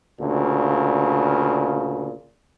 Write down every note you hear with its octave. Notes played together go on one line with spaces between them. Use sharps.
D2 A#2 C#3